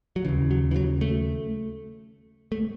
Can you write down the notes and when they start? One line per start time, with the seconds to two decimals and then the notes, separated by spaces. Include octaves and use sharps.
0.16 F#3
0.25 C#3 E3
0.28 D#2
0.51 F#3
0.71 E3
0.76 F#3
1.01 A3
2.52 A3